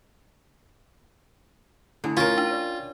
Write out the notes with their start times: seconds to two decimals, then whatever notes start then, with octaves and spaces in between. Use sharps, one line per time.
2.04 D3 A3 E4 G#5
2.17 C#4 F4 A#4
2.38 D4
2.51 C#5 D5